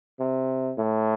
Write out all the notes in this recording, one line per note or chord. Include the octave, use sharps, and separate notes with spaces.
C3
A2